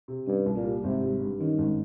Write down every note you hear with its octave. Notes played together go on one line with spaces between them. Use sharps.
C3
G2 C#4
C2
A#2
G3
G#1 C3
G3
G2
D#3 C#4
G#1